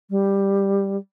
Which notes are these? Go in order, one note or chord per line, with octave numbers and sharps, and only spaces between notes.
G3